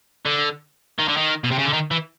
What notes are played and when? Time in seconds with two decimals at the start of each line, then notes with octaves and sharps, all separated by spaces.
0.25 D3
0.99 D#3
1.08 D3
1.17 D#3
1.44 B2
1.51 C3
1.59 C#3
1.66 D3
1.73 D#3
1.91 E3